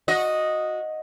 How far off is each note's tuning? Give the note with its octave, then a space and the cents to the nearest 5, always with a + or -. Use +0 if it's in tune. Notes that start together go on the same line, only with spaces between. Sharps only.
F#4 -20 D#5 +0